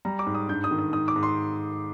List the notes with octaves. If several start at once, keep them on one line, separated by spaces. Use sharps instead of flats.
G3 A#5
D6
G#2
D#6
G2 G6
D#6
D#3
D#6
G#2 D#6
D6
G#2
C6